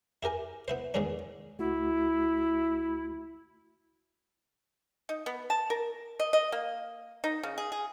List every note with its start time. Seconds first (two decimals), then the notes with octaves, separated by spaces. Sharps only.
0.23 E4 G4 A#4 G#5
0.68 B3 E4 C5
0.94 E2 G#2 D#3 G#3 C#4 D4
1.59 C#2 A3 E4 F#4
5.09 D#4
5.26 B3
5.50 A5
5.70 A#4
6.20 D#5
6.33 D#5
6.52 A#3
7.24 D#4
7.43 C#3
7.58 G#4
7.72 G#4